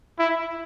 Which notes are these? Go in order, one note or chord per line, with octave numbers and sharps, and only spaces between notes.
E4